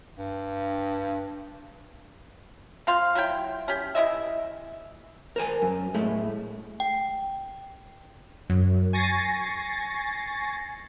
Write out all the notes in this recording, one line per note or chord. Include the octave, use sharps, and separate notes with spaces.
G2
C4 F4 F5 C6
F#3 E4 G5
C#4 G4
E3 E4 D#5 E5
A#4 C5 G#5
F#2
A2 G#3 A3
G5
F#2
G#5 C#6 A6 A#6 C7